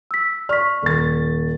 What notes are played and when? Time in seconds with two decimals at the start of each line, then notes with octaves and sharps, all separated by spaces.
0.11 E6 B6
0.49 D5 C#6 F6 B6
0.82 D#1 A6